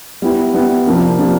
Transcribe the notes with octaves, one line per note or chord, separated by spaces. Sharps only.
G3 B3 E4
G3 B3 E4
C3 F3 A#3 D4
C3 F3 A#3 D4